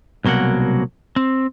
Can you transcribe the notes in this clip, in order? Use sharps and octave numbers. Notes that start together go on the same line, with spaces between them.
C2 B2 F#3 A#3 F#5
C4